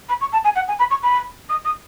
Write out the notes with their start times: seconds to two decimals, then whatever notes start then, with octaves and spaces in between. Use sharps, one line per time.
0.09 B5
0.21 C#6
0.33 A5
0.44 G#5
0.56 F#5
0.68 G#5
0.79 B5
0.91 C#6
1.03 B5
1.49 D#6
1.65 D#6